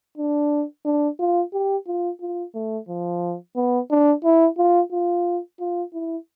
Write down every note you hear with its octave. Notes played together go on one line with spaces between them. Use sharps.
D4
D4
F4
G4
F4
F4
A3
F3
B3
D4
E4
F4
F4
F4
E4